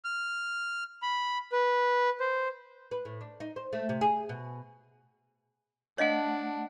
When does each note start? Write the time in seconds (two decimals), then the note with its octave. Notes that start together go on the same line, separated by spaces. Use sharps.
0.05 F6
1.02 B5
1.52 B4
2.20 C5
2.91 B4
3.05 A2
3.21 D4
3.40 D#4
3.56 C5
3.73 A3
3.89 C3
4.01 G#4
4.29 B2
5.98 A3 D4 C#5 D#5 F5 F#5